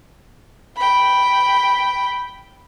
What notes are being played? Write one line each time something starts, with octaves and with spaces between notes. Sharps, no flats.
G5 B5